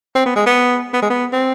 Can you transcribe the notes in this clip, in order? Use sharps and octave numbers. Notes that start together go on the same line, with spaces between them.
C4
B3
G#3
B3
B3
G#3
B3
C4